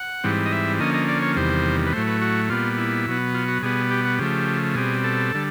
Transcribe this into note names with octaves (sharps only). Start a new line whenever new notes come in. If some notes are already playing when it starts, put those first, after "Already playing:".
Already playing: F#5
G#2 E3 G3 C4
D#5
E5
D3 F3 A#3 C#4 D#5
D#5
D5
C#5
E2 C3 D#3 G3 C5
B4
A2 F#3 A3 C5
B4
F#4
A#2 G3 B3 F4
E4
B2 F#3 B3
F4
F#4
B2 G3 B3 G#4
G4
F#4
C#3 F3 A3 G4
B2 G3 C4 G#4
A4
D3 G3